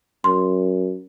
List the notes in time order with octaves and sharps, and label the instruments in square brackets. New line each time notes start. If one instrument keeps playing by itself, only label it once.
[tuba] F#2 [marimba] C6